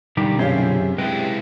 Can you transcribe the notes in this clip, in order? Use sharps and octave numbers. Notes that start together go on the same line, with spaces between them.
B1 D3 D#3 G3 G4
F#2 C3 C#4 F4 G#4 C5
G#3 E4 B4 D#5 G5